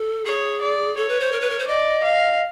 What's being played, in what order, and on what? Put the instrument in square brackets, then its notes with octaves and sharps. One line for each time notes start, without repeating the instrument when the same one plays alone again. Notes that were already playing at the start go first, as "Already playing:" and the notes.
Already playing: [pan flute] A4
[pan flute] G#4 [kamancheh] C#5
[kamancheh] D5
[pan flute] A4 [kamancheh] C#5
[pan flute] B4
C5
A#4
B4
A#4
C5
[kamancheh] D5 [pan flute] D#5
[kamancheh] F5